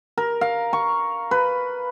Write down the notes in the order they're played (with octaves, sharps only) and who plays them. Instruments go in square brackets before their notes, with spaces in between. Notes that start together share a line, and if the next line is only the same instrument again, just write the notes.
[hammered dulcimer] A#4
F5
C#6
B4